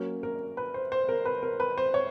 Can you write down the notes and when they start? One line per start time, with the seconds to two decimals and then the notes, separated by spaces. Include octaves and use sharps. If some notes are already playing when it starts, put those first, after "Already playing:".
Already playing: F#3 A#3 C#4
0.23 A#4
0.57 B4
0.74 C5
0.92 C5
1.09 A#4
1.25 B4
1.43 A#4
1.60 B4
1.78 C5
1.94 C#5